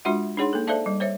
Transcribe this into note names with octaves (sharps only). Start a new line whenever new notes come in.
G#3 D4 F4 F#4 E5 F#5
D4 D#4 G#4 C#5 F#5 C6
A#3 A4
A4 C5 D5 E5 F5 A5
G3
C5 C#5 E5